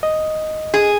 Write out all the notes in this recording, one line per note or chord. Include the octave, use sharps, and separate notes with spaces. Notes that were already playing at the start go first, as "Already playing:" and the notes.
D#5
G#4